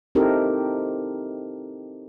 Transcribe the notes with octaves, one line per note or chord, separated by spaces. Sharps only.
C4 D#4 E4 G4 A4 A#4